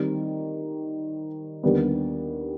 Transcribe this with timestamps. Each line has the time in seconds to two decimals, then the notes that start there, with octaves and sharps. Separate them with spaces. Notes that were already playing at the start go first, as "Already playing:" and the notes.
Already playing: D#3 G3 C4 D#4
1.63 D#2 D3 G3 B3